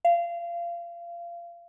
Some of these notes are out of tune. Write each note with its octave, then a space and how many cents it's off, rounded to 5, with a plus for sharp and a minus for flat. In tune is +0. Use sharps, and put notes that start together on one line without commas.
F5 -25